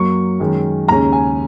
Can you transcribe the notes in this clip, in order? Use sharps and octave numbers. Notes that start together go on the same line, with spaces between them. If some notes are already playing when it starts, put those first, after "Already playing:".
Already playing: F#2 F#3 A#3 C#6
F#2 D#3 G#3 C#4
D#2 C#3 G#3 C#4 A#5
G#5